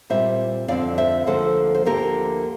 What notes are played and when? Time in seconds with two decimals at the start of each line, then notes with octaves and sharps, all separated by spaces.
0.10 A#2 G3 C4 C5 E5
0.68 F2 D3 F3 C4 D5 F5
0.98 C5 E5
1.27 D2 D3 F3 A#3 A4 C5
1.75 C5
1.85 D2 D3 F3 A#3 G4 A#4